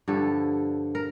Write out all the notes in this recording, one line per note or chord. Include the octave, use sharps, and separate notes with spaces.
G2 D3 F3 A4
A#4